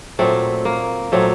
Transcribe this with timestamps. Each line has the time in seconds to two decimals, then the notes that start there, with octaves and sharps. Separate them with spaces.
0.19 A#2 F#3 A3 C4
0.65 A#3
1.12 A#2 F#3 A3 C4